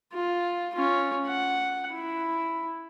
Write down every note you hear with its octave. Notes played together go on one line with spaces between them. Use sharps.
F4
C#4 F4
F#5
E4